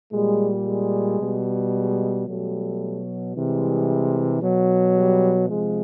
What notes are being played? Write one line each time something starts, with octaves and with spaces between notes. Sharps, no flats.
A#2 G3 G#3
G#3
B2 G3
G#3
B2 F#3 G3 A3
C3 E3 G3 G#3
B2 F#3
G3
C3 F3 G#3